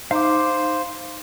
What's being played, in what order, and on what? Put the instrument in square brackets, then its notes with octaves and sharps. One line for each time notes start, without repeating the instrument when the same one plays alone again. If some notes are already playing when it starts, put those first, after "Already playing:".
[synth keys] D#4 [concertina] C5 [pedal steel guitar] F5 D6